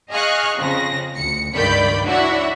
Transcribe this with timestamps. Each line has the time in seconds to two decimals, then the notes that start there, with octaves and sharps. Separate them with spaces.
0.11 G#4 D#5 F5 C#6 F6 F#6
0.58 F2 C#3 A#6
1.16 D2 C#7
1.54 C#2 G2 D#3 D5 B5 G6
2.06 D4 E4 F#4 C#5 E5 F#5